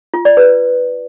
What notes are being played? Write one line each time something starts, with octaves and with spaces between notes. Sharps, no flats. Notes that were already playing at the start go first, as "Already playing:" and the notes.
F4
D5
B4